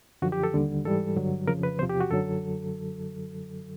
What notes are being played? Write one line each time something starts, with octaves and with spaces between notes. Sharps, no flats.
F#2 D3 F3 F#4
G4
A4
D#2 D3 G3
G#2 E3 G3 A4
G2 D3 F#3
F2 C#3 F3 A#4
B4
E2 C3 F3 C5
G4
F#4
F#2 D3 F#3 A4